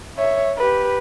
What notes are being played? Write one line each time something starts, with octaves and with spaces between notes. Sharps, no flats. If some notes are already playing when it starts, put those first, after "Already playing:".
C#5 E5
G4 B4